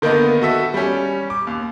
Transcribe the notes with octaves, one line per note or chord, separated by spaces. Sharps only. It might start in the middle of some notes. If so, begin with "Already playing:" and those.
D3 D#3 A#3 B3 D#4
F#4 A4 E5
G3 C#4
D6
D#2